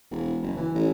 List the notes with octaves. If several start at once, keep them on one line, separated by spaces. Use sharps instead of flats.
E1
F#1
E3
A1